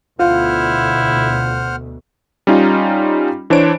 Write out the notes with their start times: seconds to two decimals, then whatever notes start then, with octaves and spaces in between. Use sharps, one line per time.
0.19 D2 B2 E4 F4 C5 F#5 F6
2.47 G3 C#4 D#4 F4
3.50 E3 D4 C5 C#5 D7